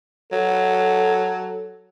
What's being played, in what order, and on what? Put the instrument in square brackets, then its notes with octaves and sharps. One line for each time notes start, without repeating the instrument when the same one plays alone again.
[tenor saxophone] F#3 [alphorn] A4